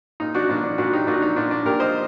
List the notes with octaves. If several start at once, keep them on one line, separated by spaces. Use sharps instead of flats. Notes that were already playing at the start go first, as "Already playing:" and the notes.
A#2 D#4
D4 F#4
A#2 D4
D4
A#2 D4 F#4
D#4 G4
A#2 D4 F#4
D#4
A#2 D4
D4
A#2 G4 A#4
C5 D#5